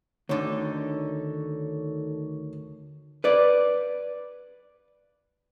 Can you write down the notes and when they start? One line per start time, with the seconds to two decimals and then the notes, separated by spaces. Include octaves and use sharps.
0.29 D2 D3 D#3 D#4 C#5
3.24 B4 D5